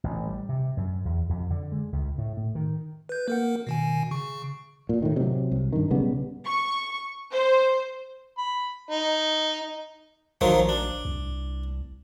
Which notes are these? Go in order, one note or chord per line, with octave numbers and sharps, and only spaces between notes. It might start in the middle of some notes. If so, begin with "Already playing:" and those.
A1
G3
C3
F#2
E2
F2
D3
G#3
C#2
A2
A2
D#3
B4 G6
A#3 A#4 F#5
B2 D#3 G#5
C#3 C#6
A#2
A2 D#3
C3 F#3
C2
G2 D#3
B1 C#3 G3 B3
C#6
C5
B5
D#4
A#1 D#3 F3 F#3
D4
C2